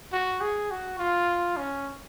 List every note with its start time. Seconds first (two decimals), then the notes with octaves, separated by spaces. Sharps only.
0.13 F#4
0.41 G#4
0.71 F#4
0.99 F4
1.57 C#4